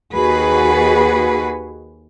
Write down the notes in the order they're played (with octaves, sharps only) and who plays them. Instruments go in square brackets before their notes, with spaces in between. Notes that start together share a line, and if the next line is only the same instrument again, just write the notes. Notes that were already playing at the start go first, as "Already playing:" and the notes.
[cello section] D#2 F#4 G#4 B4